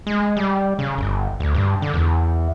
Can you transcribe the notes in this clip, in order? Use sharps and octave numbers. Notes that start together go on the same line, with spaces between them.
G#3
G3
C#3
G1
D2
G2
D3
E2